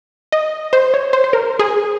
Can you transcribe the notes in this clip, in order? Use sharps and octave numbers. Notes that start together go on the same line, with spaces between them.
D#5
C5
C#5
C5
C5
A#4
G#4